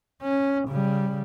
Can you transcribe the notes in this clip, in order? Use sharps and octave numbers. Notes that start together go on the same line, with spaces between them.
C#4
C#3 G3